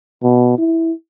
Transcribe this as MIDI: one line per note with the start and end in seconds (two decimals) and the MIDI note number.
0.23 0.57 47
0.58 0.92 64